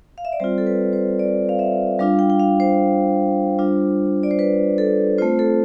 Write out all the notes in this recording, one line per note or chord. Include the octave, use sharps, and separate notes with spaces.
F5
E5
D5
G3 C4 F4 C5
A4
B4
C5
D5
F5
E5
G3 D4 F4 F5
G5
G5
F5
C5
G3 D4 F4
D5
C5
B4
A4
A3 C4 F4 C5
A4